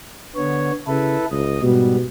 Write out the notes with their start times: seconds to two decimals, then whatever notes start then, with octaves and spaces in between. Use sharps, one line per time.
0.36 D3 B3 C#5
0.88 C#3 E4 A4 B4
1.31 C#2 D#5
1.62 G#2 B2 G3 B3